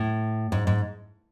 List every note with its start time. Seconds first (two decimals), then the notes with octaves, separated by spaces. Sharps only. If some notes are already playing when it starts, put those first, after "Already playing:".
Already playing: A2
0.52 G#2
0.67 G#2